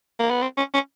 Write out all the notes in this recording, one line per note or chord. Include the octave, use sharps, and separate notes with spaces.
A#3
B3
C4
C#4
C#4